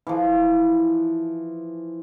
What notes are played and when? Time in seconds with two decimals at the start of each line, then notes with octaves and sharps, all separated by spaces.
0.07 E3 F3